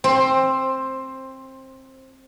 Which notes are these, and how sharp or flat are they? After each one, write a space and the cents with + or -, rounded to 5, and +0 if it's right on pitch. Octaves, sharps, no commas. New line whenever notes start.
C4 +20 C5 +10